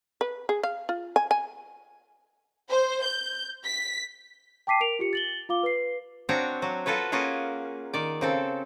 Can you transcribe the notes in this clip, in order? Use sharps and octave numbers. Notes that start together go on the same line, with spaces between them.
B4
G#4
F5
F4
G#5
G#5
C5
G6
B6
G5 A5 D6 B6 C7 D#7
A#4 D7 F7
F4 G4 C#7
A6 F#7 G7
F4 F5 D6 G7
B4 C7
C4 D4 F#4 C#5 F5 A#5
F#3 F#4
F4 F#4 A4 B4 C#5
A#3 C#4 F4 F#4 G#4
D#3 D5
C#3 C4 A4